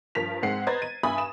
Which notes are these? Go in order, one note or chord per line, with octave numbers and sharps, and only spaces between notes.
G2 F3 A#4 B6 F7
G#2 G#3 C4 F#5 C7
B4 C5 D#5 A#5 G#6 A6
D#7
G2 E5 G#5 B5 D#6
E7